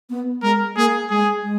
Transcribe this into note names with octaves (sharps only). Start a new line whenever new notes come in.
B3
G#3 A#4
A#3 G#4
G#3 G#4
G#3